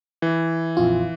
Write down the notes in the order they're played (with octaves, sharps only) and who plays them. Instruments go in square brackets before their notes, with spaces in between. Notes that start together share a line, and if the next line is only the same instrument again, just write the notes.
[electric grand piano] E3
[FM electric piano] A#1 F2 F4